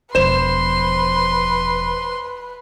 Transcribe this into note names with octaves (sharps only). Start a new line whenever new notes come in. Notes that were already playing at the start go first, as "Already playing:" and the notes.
E1 F3 B4 C5 C6 E7